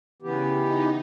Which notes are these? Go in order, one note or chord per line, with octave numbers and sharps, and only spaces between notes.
C#3 E3 B3 G4
D#4